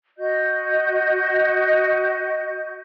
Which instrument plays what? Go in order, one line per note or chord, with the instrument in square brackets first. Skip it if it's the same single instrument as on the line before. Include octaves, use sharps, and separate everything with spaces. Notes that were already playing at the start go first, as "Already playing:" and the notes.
[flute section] F#4 D#5 G6